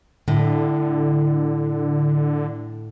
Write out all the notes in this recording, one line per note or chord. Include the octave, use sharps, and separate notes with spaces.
A2 D3